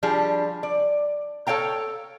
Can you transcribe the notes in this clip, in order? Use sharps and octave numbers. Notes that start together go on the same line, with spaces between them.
F3 G3 D4 G#4
D5
A4 C#5 F5 G5 A#5